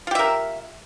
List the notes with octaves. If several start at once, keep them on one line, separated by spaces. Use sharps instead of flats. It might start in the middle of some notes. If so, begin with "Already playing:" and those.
F4 G4 A#4 E5